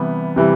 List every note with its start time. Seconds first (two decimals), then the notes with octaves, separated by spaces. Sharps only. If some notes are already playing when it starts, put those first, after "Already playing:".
Already playing: C3 E3 G3 B3
0.36 C3 E3 G3